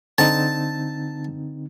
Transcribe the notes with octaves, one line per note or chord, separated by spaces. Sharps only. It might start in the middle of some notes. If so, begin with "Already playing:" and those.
D3 C4 D#4 A5